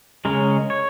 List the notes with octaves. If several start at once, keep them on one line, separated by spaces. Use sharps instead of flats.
C#3 G#3 C#4 A#4
C#5